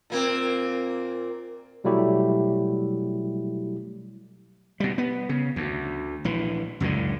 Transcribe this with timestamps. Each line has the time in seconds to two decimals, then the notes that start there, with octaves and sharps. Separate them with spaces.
0.10 A#2 A#3 C4
1.84 B2 F#3 G3 A3 E4 G4
4.80 B2 G3
4.98 B3
5.29 C#3
5.56 D2
6.24 A#1 E3
6.80 C#2 F#2 A2 D3